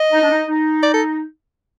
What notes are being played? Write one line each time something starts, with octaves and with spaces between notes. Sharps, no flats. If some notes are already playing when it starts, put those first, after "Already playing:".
Already playing: D#5
D#4
D4
D#4
D#4
D5
A4